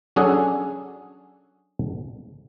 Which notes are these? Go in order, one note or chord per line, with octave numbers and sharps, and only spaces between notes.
F#3 C#4 D4 G#4 A4 F#5